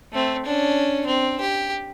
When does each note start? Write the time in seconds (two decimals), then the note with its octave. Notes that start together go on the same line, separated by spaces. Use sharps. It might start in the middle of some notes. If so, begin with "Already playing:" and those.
0.12 A3 C4
0.46 C#4 D4
1.06 C4
1.41 G4